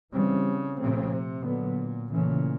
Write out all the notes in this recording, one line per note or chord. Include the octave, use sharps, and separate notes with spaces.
C#3 E3 G3 C4
A#2 C#3 F3 A3 C4
C3
A#2 D3 F#3 B3
A#2 C#3 E3 A3 C#4